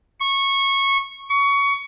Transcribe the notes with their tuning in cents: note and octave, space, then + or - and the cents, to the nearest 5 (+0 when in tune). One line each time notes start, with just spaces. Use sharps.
C#6 -15
C#6 +20